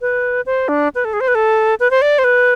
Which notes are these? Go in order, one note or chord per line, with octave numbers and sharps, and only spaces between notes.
B4
C5
D4
B4
A4
G#4
C5
B4
A4
B4
C5
D5
C5
B4